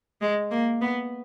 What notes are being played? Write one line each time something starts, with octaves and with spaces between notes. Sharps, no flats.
G#3
A#3
B3